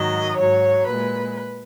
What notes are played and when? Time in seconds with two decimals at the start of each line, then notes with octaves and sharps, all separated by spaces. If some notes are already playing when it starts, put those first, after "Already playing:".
Already playing: G#2 D#3 F#3 D#5
0.37 G#2 F#3 C#5
0.87 A#2 G#3 B4